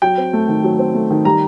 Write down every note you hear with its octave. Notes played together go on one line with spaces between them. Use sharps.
F#3 G5
C4
A3
D#3
F#3
C4
A3
D#3
G3 A#5